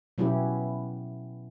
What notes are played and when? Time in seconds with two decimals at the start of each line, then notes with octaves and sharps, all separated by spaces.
0.18 B2 F#3 B3 C#4 E4 G4